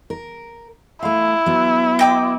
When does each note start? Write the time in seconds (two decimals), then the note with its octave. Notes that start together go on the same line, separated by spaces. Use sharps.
0.10 A#4
1.03 A3 E4 F5
1.46 F#3 B3
1.99 D#5 G5 D6